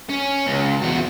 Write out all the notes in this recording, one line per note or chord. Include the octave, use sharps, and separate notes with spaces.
C#4
C#2
E2 F#4